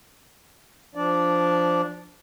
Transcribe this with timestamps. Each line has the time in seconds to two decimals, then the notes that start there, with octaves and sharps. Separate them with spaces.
0.95 F3 D4 D5